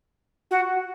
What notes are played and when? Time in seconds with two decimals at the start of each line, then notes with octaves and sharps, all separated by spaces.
0.50 F#4